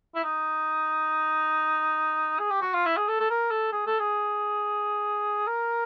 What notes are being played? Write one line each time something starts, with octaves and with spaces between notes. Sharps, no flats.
E4
D#4
G#4
G4
F#4
F4
E4
G#4
A4
A4
A#4
A4
G#4
A4
G#4
A#4